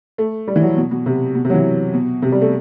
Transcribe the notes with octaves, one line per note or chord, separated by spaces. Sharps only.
A3
G3
E3
F#3
B2
B2
C3
B2
C3
F#3
E3
B2
C3
G3
A3